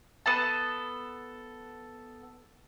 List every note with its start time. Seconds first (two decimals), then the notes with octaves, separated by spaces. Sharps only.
0.26 B3 A4 A5